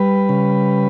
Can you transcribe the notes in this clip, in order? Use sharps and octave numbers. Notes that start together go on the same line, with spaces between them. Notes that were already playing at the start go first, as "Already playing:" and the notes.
Already playing: G3 B4
C#3